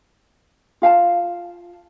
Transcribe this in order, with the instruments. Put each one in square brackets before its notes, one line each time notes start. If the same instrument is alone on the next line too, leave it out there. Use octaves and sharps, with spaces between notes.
[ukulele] F4 F5 G5 A5